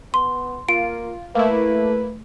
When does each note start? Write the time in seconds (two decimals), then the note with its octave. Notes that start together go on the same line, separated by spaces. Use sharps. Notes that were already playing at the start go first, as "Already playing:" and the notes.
0.14 B3 C6
0.69 A#3 F4 D7
1.35 A3 A#3 E4 B4